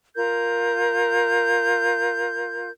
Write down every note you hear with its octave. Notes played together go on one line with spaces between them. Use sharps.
F4 A#4 G6